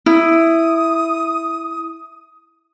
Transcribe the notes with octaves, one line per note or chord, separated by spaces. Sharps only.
E4 D#6